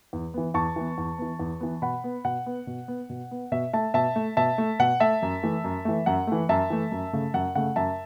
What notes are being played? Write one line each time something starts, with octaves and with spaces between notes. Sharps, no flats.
E2
E3 B3
E2 A5 C#6
E3 B3
E2
E3 B3
E2
E3 B3
B2 F#5 B5
B3
B2 F#5
B3
B2
B3
B2
B3
B2 E5
A3 E5 A5
B2 E5 A5
A3
B2 E5 A5
A3
B2 F#5
A3 E5 A5
F#2
E3 A3
F#2
E3 A3
F#2 F#5
E3 A3
F#2 E5 A5
E3 A3
F#2
C#3 A3
F#2 F#5
C#3 A3 F#5
F#2 E5 A5